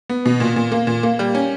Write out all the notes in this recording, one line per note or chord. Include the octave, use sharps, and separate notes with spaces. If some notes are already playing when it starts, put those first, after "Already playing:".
B3
B2
A#2
A#2
A#3
A#2
A#3
G3
C#4